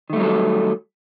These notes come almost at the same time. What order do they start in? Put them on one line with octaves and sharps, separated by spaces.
D#3 A3 G3 F#3 A4